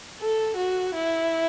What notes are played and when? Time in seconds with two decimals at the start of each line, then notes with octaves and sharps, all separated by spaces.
0.19 A4
0.57 F#4
0.95 E4